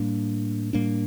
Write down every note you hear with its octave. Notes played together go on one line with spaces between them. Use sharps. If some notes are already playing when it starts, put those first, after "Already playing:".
Already playing: A2 G3 A#3 D4
A2 G3 A#3 D4